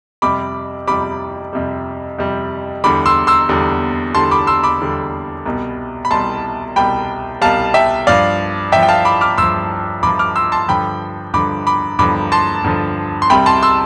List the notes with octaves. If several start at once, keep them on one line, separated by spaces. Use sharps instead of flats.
F2 C3 G3 B5 D6
F2 C3 G3 B5 D6
F2 C3 G3
F2 C3 G3
E2 D3 G3 B5 D6
C6 E6
C6 E6
E2 D3 G3
E2 D3 G3 A5 C6
B5 D6
C6 E6
B5 D6
E2 D3 G3
C2 B2 G3
B5
C2 B2 G3 A5 C6
C2 B2 G3 G5 B5
C2 B2 G3 F5 A5
E5 G5
G2 F3 D5 F5
G2 F3 E5 G5
G5
F5 A5
B5 D6
D6 F6
G2 F3 C6 E6
G2 F3 B5 D6
D6 F6
C6 E6
A5 C6
G2 D3 F3 G5 B5
G2 D3 F3 B5 D6
B5 D6
G2 D3 F3 B5 D6
A5 C6
G2 D3 F3
C6
C2 C3 G3 G5 B5
A5 C6
C6 E6